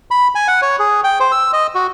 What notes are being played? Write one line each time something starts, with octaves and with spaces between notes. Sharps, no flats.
B5
G#5
F#5
C#5
G#4
G5
C5
E6
D#5
F#4